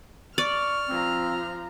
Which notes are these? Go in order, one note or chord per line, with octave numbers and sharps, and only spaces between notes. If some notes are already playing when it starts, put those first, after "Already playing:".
D5 C#6 F6
F3 C4 A#5